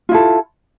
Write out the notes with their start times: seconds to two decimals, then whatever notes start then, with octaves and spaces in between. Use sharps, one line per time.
0.09 F4
0.12 E4
0.14 A4